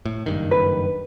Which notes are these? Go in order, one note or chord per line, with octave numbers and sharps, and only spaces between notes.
A2
F#1 G2 D#3
B4